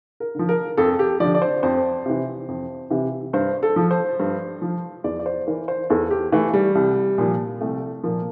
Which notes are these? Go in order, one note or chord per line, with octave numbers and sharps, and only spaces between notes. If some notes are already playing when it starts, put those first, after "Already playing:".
A#4
D3 F3
A#4
F2 A4
G4
D3 F3 D5
D5
C5
F2 C5
C3 E3
F2
C3 E3
G2 C5
A4
F3
C5
G2
F3
E2 D5
D5
C5
E3 A#4
C5
E2 A4
G4
E3 A3
G3
C2
A#2 F3
C2 A3
A#2 F3 A#3